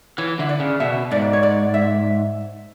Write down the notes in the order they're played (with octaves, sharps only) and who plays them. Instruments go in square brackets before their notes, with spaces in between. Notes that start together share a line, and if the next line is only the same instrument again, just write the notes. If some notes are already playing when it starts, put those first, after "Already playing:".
[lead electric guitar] E3 [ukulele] C#5
[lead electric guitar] D3 [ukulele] E5
[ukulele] D5
[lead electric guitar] C#3
[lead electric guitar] B2 [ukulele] E5
[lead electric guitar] G#2 [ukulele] D5
[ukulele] C#5
D5
E5